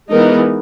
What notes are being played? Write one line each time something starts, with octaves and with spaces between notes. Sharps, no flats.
E3 G#3 B3 D#4 A#4